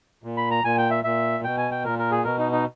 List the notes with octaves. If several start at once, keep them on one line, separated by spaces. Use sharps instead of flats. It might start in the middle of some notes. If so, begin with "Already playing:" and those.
A#2
B5
A#5
A#2 G#5
G5
E5
A#2 E5
B2 G5
G#5
G5
A#2 A#4
A#4
G#4
B2 A#4
D#4
D#4